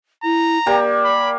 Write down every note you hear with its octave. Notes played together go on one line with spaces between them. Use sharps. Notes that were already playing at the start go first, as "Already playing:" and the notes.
E4 A#5
A#3 G4 D5
B5